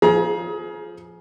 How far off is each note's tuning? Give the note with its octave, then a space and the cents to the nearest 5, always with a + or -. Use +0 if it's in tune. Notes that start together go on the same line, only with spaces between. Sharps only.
F3 +0 G#4 +25 A#5 +35